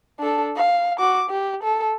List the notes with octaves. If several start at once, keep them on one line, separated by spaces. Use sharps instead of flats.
D4 A4
F5
F#4 D6
G4
A4